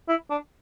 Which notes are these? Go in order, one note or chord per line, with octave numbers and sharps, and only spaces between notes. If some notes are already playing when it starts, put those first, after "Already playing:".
E4
D4